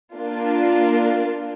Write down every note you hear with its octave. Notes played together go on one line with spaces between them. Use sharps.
A#3 D4 F4